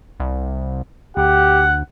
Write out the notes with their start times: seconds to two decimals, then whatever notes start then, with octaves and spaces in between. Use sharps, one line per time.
0.20 C2
1.17 D2 G4 F#5